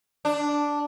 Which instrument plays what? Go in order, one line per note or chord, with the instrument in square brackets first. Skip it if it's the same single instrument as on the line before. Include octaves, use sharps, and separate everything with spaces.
[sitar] D4